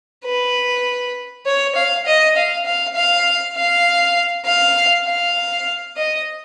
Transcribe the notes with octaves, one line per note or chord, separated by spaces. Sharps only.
B4
C#5
F5
D#5
F5
F5
F5
F5
F5
F5
D#5